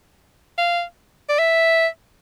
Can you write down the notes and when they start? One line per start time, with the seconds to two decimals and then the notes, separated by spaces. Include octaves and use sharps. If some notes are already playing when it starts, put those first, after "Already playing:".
0.58 F5
1.29 D5
1.39 E5